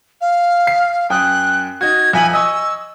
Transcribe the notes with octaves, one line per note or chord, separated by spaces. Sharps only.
F5
C7
F#2 G5 D#6 F#6
D#4 F#4 G#6
F2 E5 G#5 F#7
D#5 G#5 C#6 E6